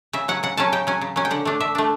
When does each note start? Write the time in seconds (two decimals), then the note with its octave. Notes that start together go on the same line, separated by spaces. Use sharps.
0.13 C#3 E5
0.28 F#3 C#4 F#5
0.43 C#3 F#5
0.57 F#3 C#4 A5
0.72 C#3 G5
0.87 F#3 C#4
1.01 C#3
1.16 F#3 C#4
1.25 G5
1.31 D3 F#5
1.45 A3 D4
1.60 D3 E5
1.75 A3 D4